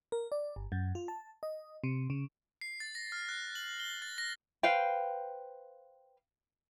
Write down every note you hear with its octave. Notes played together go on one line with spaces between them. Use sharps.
A#4
D5
G1
F#2
F4
A5
D#5
C3
C#3
C7
A6
A#6
F6
F#6
F#7
G7
A6
A#6
B4 C5 F5 G5